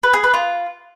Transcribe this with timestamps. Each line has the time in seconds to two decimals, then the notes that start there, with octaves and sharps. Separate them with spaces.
0.03 B4
0.13 G#4
0.24 B4
0.34 F4